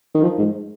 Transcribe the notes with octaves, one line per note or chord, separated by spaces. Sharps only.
D#3
F3
G#2